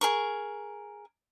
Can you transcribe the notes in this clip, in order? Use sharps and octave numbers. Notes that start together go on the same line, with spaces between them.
G#4 A#4 C#6